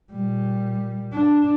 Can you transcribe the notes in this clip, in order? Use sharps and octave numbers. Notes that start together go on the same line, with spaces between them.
A#2 G3
D4